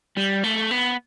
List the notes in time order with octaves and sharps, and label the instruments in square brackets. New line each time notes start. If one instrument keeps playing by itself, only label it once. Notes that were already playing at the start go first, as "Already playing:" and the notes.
[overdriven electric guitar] G3
A3
B3